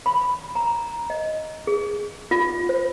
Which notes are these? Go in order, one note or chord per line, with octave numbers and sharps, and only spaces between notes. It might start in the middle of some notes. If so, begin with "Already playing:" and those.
B5
A#5
D#5
G#4
F4
C5